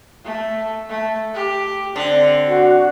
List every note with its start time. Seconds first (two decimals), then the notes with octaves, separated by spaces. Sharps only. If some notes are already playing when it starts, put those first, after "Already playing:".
0.25 A3
0.89 A3
1.35 G4
1.96 D3 C4
2.47 F#4